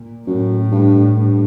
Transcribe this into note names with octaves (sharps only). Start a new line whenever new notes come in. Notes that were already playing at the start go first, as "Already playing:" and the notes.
Already playing: A#2
F#2 A2
G2
G2